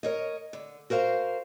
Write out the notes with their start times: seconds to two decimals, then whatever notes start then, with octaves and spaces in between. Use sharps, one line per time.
0.03 A#4 C#5 D#5
0.53 D3
0.90 F#4 A#4 C5 F5